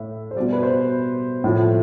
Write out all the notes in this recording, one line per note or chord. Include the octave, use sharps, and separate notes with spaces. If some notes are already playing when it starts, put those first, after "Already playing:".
Already playing: A2 A3 E5
C5
B2 G3 D5
B4
C5
A2 F3 A3